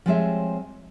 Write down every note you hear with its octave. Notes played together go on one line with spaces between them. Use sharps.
F3 G3 G#3 C4 C#5 E5